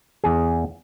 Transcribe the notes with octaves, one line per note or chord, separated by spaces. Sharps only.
E2 G#4